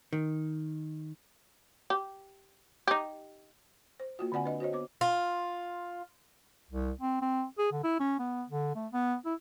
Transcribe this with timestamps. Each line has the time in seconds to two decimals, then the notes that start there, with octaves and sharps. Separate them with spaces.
0.13 D#3
1.90 G4
2.88 D#4 G4
4.00 C5
4.19 A#3 F4 F#4
4.32 D3 C4 D5 F#5 G#5
4.44 D4 B4 D#5
4.60 F#4 C5 C#5 D#5
4.73 B3 C5 D6
5.01 F4
6.70 C2
7.01 C4
7.22 C4
7.58 G#4
7.73 D3
7.84 E4
8.00 C#4
8.19 B3
8.50 D3
8.75 A3
8.93 B3
9.26 E4